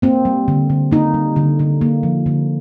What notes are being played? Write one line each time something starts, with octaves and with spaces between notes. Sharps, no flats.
A#3 C4
G3
D3
D3
A#3 D#4
G3
D3
D3
A#3
F3
D3